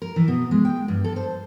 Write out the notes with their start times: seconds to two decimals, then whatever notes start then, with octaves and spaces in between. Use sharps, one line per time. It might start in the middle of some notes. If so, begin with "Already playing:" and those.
0.02 A#4
0.16 E3
0.28 B2
0.51 G#3
0.65 G5
0.88 G2
1.04 A4
1.16 C5